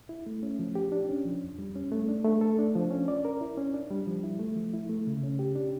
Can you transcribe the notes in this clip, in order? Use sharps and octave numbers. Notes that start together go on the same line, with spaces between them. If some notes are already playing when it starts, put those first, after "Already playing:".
E4
A3
C#4
F3
G4
D4
C#4
F3
F2
G3
C#4
A3
D4
A3
A4
D4
F3
C#4
D5
A#4
E4
C#4
D4
G3
F3
E4
A3
F3
E4
A3
C#3
C#4
G4
D4